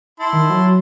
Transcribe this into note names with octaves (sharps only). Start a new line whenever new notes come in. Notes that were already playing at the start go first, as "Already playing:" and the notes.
E4 A5 C6
D#3
F#3